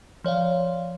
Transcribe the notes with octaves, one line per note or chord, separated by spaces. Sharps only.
F3 C#5 D5 F5